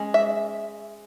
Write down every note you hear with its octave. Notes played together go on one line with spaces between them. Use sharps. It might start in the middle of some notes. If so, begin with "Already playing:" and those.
Already playing: G#3 C#4
E5